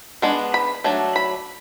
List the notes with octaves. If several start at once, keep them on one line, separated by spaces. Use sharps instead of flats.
G#3 B3 D4
B5
F#3 A3 D4
B5